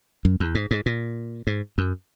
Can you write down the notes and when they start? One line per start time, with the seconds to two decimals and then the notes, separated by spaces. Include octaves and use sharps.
0.25 F#2
0.40 E2
0.55 G#2
0.71 G#2
0.86 A#2
1.47 G#2
1.78 F#2